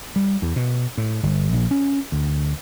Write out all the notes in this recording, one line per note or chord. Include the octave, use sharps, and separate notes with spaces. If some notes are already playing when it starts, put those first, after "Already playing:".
G3
E2
B2
A2
G1
A#1
C#4
D2